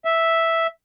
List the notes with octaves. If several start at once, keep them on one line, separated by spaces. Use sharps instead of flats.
E5